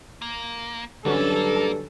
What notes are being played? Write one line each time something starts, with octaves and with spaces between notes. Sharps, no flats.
A#3
B1 G2 D3 E3 F#3 C#4 A4
A#3